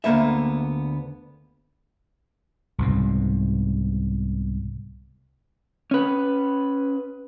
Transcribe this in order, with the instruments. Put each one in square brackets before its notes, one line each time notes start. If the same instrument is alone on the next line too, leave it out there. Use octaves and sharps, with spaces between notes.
[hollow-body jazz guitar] D2 D3 A#3 B3 E5
[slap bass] C2 G#2 B2
[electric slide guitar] C#4 B4